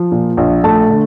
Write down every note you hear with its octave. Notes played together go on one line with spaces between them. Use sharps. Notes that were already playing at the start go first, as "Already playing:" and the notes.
Already playing: F3
A#2
A#1
A3 A5
D3